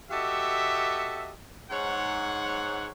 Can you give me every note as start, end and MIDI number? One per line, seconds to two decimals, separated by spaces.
0.11 1.31 66
0.11 1.31 67
0.11 1.31 69
0.11 1.31 75
0.11 1.31 76
1.71 2.88 44
1.71 2.88 73
1.71 2.88 78